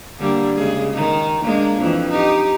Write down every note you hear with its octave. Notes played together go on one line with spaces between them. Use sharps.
D3 G3 A#3
C#3 G#3 G#4
D#3 D#4
G#3 A#3 D4
F2 E3
D#4 G4